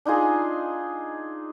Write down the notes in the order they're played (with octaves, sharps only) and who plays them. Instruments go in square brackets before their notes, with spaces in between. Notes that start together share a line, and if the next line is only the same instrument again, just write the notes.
[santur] D4 D#4 F4 G#4